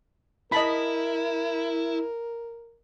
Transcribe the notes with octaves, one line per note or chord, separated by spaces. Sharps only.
E4 A#4 D#5 A5 B5